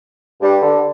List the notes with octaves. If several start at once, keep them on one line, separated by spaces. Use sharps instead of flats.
G2 G3
D3